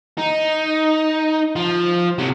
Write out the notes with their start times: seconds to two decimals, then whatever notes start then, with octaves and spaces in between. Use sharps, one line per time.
0.18 D#4
1.56 F3
2.18 C3 F#3